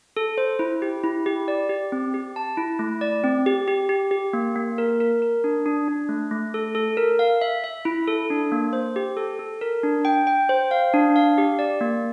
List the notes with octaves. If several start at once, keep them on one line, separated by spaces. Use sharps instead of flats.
A4
C5
E4
G4
E4
G4
D5
G4
C4
G4
A5
E4
A3
D5
C4
G4
G4
G4
G4
A#3
A#3
A#4
A#4
A#4
D4
D4
D4
A3
A3
A4
A4
A#4
F5
E5
E5
E4
A4
D4
A#3
C5
G4
A4
A4
A#4
D4
G5
G5
C5
F5
D4
F5
G4
D5
A#3